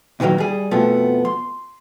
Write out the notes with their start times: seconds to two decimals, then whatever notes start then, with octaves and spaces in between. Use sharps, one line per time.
0.20 A#2 D#3 E3 F#3 A#3
0.38 G3 G#4
0.71 F2 B2 F3 A3 B3
1.25 C6